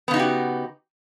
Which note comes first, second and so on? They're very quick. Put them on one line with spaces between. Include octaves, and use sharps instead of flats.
B3 C#3 D#4 F#4 G4